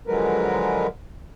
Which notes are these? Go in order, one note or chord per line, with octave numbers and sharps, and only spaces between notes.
D3 F3 F#3 G#3 A#4 B4